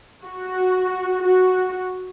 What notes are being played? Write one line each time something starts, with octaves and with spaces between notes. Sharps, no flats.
F#4
F#4